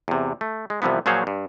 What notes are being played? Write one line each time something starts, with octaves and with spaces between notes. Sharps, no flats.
E2 C3
A3
G#3
C2 C3 E3 F3 B3
A#2 F3 F#3 G#4 C5 C#5
G2